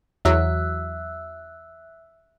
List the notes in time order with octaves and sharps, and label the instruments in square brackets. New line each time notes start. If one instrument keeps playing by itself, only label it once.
[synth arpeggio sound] E2 F#3 [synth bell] E5 E6 F#6